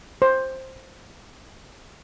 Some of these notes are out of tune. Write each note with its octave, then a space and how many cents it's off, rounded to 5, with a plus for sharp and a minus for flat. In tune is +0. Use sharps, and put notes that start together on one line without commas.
C5 +10